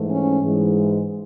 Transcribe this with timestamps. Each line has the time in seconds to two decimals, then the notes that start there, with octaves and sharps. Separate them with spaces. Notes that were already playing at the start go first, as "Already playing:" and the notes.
Already playing: G#2 E3 A3
0.10 C#4
0.41 G#2 E3 G#3